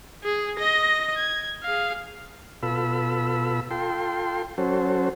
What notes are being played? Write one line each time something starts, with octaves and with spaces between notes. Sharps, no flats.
G#4
D#5 A#6
G#6
G#4 F5
B2 F4 A4 B5 E6
F4 A4 G5 C6
F#3 C#4 F#4 A4 C5